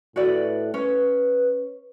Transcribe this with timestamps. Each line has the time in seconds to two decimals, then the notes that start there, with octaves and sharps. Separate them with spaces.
0.16 A2 F#4 B4 D5
0.74 C#4 B4